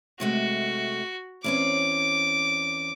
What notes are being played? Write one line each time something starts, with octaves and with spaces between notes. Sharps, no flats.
C3 G#3 A3 F#4
E2 C4 C#4 D6